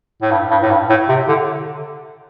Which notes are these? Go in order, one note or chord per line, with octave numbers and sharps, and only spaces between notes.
A2
G2
G2
A2
G2
A2
C3
D3